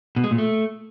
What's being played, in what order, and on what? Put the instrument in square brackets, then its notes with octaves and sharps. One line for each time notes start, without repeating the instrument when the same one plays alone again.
[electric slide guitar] B2
G#3
A#2
A3